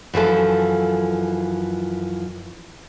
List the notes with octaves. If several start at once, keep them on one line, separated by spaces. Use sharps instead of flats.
F#2 E3 F3 A4